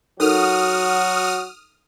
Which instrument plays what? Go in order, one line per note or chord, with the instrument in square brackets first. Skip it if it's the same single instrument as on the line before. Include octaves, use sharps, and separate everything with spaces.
[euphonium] F#3 [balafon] D#4 A4 A#4 [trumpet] F#4 [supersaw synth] D#6 F6